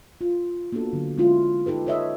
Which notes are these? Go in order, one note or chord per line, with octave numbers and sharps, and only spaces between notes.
F4
A#3 B3 D4 F#4 A4
D3 F#3
G#3 C#4 E4 F4
D#4 G4 A4 B4
A4 B4 C#5 D#5 E5